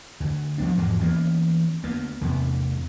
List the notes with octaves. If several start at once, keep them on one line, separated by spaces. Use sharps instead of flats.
D2
F3 B3 D4
E2 G#2 F3 G#3
E3 A#3 B3 C#4
D2 A#3 B3
A1 E2 C3 B3